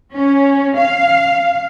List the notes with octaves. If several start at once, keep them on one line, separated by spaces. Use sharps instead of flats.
C#4
F5